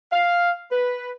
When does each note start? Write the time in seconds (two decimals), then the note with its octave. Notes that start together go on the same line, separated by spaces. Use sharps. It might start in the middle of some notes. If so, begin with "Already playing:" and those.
0.13 F5
0.72 B4